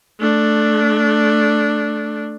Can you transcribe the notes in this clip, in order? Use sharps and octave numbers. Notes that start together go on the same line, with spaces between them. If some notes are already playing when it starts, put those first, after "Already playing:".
A3 D4